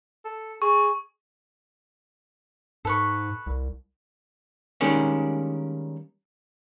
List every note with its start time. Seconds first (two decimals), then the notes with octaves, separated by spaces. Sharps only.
0.25 A4
0.62 G#4 C#6
2.85 G#2 A4 B4 C#6
3.46 C2
4.81 D#3 G3 G#3 A#3 C#4 D4